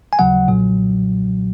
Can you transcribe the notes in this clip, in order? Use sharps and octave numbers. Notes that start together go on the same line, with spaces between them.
G#5
D#2 C#3 F#3 F#5
B1 A#2 F#3